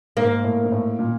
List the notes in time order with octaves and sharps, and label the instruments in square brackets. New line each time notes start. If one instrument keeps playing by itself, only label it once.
[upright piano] G#2 [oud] A#3
[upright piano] A2
G#2
A2
A#2